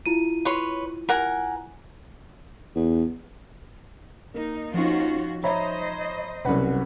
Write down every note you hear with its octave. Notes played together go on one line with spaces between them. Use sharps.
E4 F4 D#7
B4 C#5 C6
A#4 F#5 G#5
E2
A#3 D#4
F3 C#4 D#4 F4 F#4
C5 C#5 D#5 E5 A#5 B5
C2 B2 F#3 C#4 B4 F#5 B5